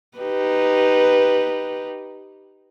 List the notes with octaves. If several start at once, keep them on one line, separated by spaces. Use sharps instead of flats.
D#4 G4 B4